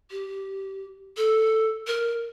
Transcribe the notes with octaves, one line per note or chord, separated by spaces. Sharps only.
G4
A4
A#4